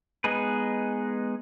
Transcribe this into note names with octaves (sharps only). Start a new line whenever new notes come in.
G#3 B3 D#4 G#4 B4